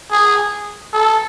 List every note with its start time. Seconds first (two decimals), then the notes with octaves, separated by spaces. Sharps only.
0.11 G#4
0.93 A4